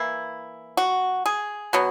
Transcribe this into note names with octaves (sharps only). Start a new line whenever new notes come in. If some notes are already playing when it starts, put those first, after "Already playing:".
Already playing: E3 A#3 E4
F#4
G#4
B2 F#3 B3